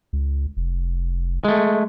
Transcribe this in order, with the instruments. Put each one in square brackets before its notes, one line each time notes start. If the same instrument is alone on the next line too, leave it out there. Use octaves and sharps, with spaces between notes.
[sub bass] C#2
F1
[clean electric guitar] G#3 A3